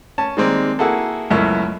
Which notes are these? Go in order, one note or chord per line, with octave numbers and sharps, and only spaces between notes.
C#4 A5
D#3 G3 G#3 A#3 C4
A#3 E4 F#4 G#4 A4
C#2 F#2 B2 A3 E4 A#4